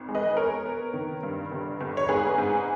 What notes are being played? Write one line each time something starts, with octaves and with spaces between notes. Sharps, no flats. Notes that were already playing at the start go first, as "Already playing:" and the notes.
Already playing: G#1
G#3
B4 D#5
B3 A#4 C#5
B3
D#3
G2
G1
G1
C#5
G#2 G#4 B4
G#2